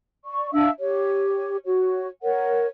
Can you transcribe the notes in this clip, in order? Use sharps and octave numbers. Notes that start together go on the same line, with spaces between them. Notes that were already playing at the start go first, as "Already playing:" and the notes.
D5 C#6
D4 E5 F5 E6
G4 C#5
F#4 C#5
A#4 C#5 F#5